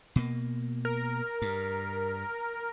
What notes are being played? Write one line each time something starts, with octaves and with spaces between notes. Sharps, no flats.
B2 A#3
A#4
G2